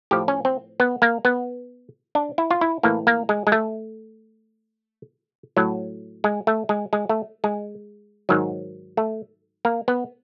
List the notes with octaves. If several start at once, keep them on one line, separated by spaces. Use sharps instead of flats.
A2 F3 G4
C#4
C4
B3
A#3
B3
D4
E4
F4
E4
A2 E3 A#3
A#3
G#3
G#3
A3
A2 F#3
G#3
A3
G#3
G#3
A3
G#3
G#2 D#3 F#3
A3
A#3
B3